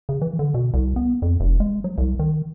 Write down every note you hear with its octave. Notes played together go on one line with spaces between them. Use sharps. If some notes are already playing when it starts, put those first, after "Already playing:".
C#3
E3
D3
B2
C2
B3
F2
F1
G#3
F#3
C2
D#3